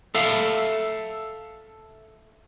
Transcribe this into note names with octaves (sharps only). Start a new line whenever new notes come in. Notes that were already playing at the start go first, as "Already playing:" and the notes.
A4 E5 F5